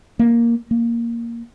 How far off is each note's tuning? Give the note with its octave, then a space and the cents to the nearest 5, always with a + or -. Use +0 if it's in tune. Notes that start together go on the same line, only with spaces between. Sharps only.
A#3 +5
A#3 +0